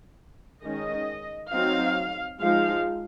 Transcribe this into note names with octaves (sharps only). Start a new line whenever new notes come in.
D#3 G#3 C#4 D#5
F#3 C4 D#4 F5
F3 G#3 D#4 F5